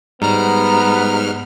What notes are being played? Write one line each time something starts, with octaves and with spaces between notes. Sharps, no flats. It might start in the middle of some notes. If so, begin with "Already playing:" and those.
G#2 G3 B3 A#5 F6